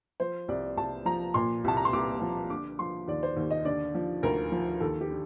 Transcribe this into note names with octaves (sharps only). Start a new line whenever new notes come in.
F3 C5
C2 D5
C2 A5
F3 A#5
A#2 C6
C2 A5
A#5
C6
C2 D6
F3
D3 D6
F3 C6
D#2 D5
C5
D#2
D#5
D3 D5
F3
D2 A#4
F3
D#2 A4
G4
D3